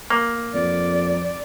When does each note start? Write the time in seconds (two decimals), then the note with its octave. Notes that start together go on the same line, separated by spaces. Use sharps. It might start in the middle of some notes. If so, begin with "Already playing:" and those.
0.10 A#3
0.54 F2 D5